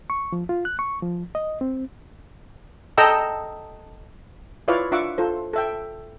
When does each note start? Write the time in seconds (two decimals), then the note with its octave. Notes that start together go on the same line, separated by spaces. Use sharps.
0.10 C#6
0.32 F3
0.49 F4
0.65 F#6
0.79 C#6
1.02 F3
1.35 D#5
1.61 C4
2.98 A4 D#5 G5 A#5 E6
4.68 E4 F4 B4 C#5 D5 F5
4.92 D4 F4 E5 F#5 C#6 D6
5.18 F4 A4 C5
5.53 A4 E5 G5